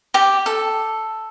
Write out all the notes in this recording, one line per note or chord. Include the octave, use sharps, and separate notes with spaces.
G4
A4